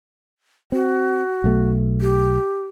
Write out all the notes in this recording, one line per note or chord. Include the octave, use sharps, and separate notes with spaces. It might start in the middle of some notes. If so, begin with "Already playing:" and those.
C4 F#4
B1 B2 A3
G4